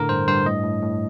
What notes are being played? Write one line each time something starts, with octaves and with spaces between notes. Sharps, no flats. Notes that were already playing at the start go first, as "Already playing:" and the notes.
Already playing: A2 D3 A#4
G2 C5
G2 C5
A2 D#5
A2
A2